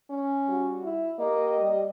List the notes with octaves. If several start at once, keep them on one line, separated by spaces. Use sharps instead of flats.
C#4
G3 F#4
E4
A#3 G4 D#5
G3